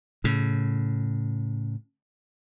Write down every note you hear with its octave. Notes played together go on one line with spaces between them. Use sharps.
A2 C#3